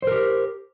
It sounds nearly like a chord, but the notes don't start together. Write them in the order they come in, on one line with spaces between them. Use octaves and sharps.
C5 A#4 G4